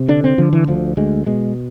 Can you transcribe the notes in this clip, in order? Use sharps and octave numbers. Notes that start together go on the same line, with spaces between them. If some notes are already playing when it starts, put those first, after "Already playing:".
Already playing: C3
D3 D4
C4
D3 F3
E3
D2 F3
D2 G#3
B2 G#3